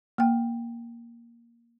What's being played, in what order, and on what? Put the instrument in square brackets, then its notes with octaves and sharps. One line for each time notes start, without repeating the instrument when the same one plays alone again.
[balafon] A#3 G5